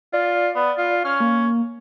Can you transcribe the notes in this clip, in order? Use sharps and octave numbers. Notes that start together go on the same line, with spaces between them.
F4 D5
B3
F4
C#4 F6
A#3